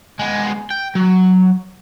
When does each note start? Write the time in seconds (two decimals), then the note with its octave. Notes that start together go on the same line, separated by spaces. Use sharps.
0.19 G#3 B3
0.70 G5
0.95 F#3